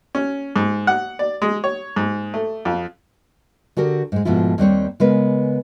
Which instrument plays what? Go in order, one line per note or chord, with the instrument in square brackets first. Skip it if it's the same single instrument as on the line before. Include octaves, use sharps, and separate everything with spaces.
[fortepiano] C#4
G#2
F#5
D5
G#3
C#5
G#2
A3
F2
[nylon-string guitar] D3 F#4 G4 A#4
G#2 G#3
G#2 B2 F3 A3 E4 F4
D#2 G3 C4 C#5
C#3 G#3 B3 A#4 B4